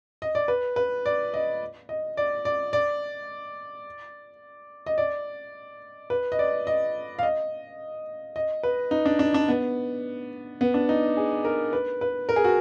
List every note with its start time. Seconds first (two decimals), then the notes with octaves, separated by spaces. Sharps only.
0.22 D#5
0.35 D5
0.48 B4
0.76 B4
1.06 D5
1.34 D#5
1.89 D#5
2.17 D5
2.45 D5
2.73 D5
4.86 D#5
4.98 D5
6.10 B4
6.32 D#5
6.39 D5
6.67 D#5
7.19 F5
7.23 D#5
8.36 D#5
8.63 B4
8.91 D#4
9.05 D4
9.19 D4
9.34 D4
9.48 B3
10.61 B3
10.74 D4
10.89 D#4
11.17 G#4
11.45 A#4
11.73 B4
12.01 B4
12.29 A#4
12.36 G#4
12.44 F#4